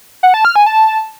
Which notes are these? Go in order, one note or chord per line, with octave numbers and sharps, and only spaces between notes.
F#5
A5
F6
G#5
A5